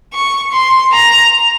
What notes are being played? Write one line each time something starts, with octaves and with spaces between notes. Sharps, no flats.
C#6
C6
A#5